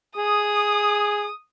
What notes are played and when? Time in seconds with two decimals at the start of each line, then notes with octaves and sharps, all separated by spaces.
0.17 G#4 D#6